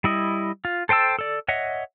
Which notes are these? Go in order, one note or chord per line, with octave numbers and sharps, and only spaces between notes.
G3 E4 D#5
F4
A4 C5 G5 A5 E6
A4 D5
C#5 D#5 E5 F#5